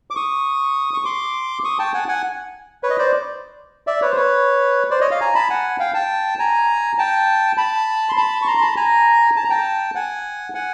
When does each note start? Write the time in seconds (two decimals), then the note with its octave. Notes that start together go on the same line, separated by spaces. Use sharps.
0.10 D6
0.15 C#6 D#6
0.94 C#6
1.05 C6 D6
1.64 C#6 D#6
1.79 G5 A5
1.94 F#5 G#5
2.08 F#5 G#5
2.83 B4 C#5
2.90 D#5
2.98 C5 D5
3.87 D5 E5
4.01 B4 C#5
4.11 C5
4.16 B4 C#5
4.91 C5 D5
5.01 C#5 D#5
5.11 D#5 F5
5.21 G#5 A#5
5.35 A5 B5
5.50 F#5 G#5
5.79 F5 G5
5.94 G5 A5
6.39 G#5 A#5
6.98 G5 A5
7.57 A5 B5
8.09 C6
8.17 A5 B5
8.42 C#6
8.46 A#5 C6
8.58 C6
8.61 A5 B5
8.76 G#5 A#5
9.36 A5
9.44 A#5
9.50 G5 A5
9.95 F#5 G#5
10.54 F#5 G#5